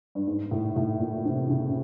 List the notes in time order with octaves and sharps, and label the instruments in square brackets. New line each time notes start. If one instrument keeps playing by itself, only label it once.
[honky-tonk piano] G2
G#2
A2
A2
A#2
C3
C#3